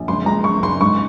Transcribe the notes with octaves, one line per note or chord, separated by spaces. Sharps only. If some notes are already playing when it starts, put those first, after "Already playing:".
Already playing: A#1
C#2 C6
G#3 A#5
G#3 C#6
C#2 C6
G#2 C#6